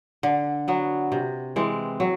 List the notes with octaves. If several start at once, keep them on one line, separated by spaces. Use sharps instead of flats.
D3
F#3 B3
C3
E3 G#3 C4
F#3